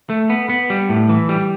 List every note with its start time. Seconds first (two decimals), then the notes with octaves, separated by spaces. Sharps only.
0.10 A3
0.30 B3
0.50 B3
0.70 G3
0.89 A2
1.09 E3
1.29 G3